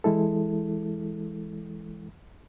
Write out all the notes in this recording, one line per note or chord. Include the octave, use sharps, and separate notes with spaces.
E3 G#3 E4 A4